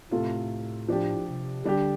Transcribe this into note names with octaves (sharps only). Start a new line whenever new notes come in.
A2 C3 A3 F4 A4
F3 D4 G4
C3
D3 G3 D4 G4